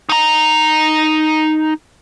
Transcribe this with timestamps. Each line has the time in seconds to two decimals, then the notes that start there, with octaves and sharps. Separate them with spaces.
0.09 D#4 A#5